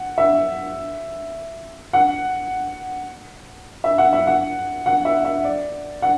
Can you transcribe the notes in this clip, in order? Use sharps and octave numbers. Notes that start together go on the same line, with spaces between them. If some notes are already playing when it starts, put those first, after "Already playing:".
Already playing: F#5
E5
F#5
E5
F#5
E5
F#5
F#5
E5
E5
D5
F#5